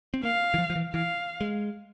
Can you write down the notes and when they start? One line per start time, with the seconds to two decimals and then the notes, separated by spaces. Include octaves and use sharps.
0.14 C4
0.23 A#3 F5
0.54 E3
0.58 F3
0.70 F3
0.76 E3
0.94 E3 F5
1.41 G#3